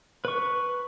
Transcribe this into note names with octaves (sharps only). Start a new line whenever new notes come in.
B4 C#6